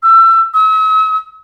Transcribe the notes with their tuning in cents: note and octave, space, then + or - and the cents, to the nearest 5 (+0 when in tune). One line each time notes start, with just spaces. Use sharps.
E6 +25
E6 -40